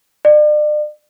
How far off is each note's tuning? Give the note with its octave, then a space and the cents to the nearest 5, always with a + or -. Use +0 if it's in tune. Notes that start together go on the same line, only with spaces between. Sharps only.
D5 +40